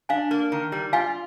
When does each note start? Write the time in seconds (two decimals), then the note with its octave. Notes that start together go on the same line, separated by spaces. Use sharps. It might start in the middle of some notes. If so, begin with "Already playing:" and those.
0.09 D4 F5 G#5
0.31 A#3
0.52 D#3
0.72 G3
0.93 F4 F5 G#5